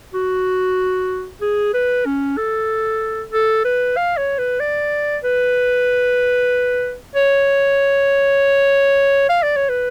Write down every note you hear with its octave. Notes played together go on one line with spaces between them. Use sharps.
F#4
G#4
B4
C#4
A4
A4
B4
F5
C#5
B4
D5
B4
C#5
F5
D5
C#5
B4